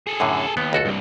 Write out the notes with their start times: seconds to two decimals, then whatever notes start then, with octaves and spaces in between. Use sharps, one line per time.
0.07 G#4 A4
0.20 F#2 A2 D3
0.57 D#2 B3
0.73 C#2 F#4 A4
0.85 C2 G2